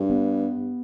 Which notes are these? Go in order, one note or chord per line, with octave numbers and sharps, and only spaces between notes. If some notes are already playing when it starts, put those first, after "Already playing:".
Already playing: G2
B3